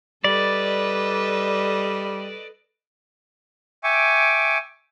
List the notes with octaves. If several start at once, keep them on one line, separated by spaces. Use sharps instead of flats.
G3 A4 B4 D5 D#5
E5 G5 G#5 C#6 D6